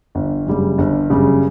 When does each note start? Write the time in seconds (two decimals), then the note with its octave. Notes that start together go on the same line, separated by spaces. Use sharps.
0.15 G1
0.47 F#2 C#3 G3
0.78 G1
1.10 F#2 C#3 G3